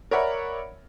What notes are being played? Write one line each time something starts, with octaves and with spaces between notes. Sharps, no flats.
A#4 C#5 D5 E5 F#5 B5